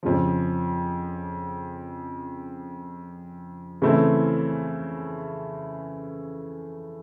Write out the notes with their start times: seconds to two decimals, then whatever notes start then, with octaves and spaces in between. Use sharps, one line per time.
0.03 F2 C#3 F3
3.82 C#3 E3 A3 C4 E4